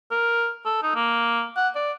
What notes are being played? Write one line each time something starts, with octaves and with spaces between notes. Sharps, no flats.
A#4
A4
D#4
A#3
F#5
D5